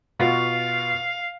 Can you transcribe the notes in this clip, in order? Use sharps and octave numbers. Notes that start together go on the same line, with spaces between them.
B2 F4 F#4 F5